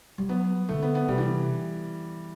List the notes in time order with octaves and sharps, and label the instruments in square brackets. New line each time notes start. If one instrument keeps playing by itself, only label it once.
[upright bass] G3
[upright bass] F#3 [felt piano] B3
[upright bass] D3 [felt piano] A3
[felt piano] B3
B3
[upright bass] C3 [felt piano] G3
[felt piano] E3